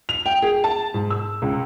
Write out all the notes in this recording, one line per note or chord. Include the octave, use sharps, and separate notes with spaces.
F7
G5
G#4
A5
G#2
E6
C#2